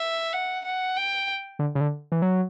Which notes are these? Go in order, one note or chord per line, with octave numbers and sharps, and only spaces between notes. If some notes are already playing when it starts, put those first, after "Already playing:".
Already playing: E5
F#5
F#5
G5
D3
C#3
D3
E3
F#3